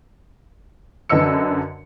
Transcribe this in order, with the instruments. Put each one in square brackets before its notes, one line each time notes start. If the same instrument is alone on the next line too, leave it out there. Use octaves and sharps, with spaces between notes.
[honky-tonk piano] F#2 D3 B4 D#5 E6 C#7